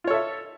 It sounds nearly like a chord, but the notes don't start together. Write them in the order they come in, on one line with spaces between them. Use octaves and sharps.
F4 C#5 A4 E5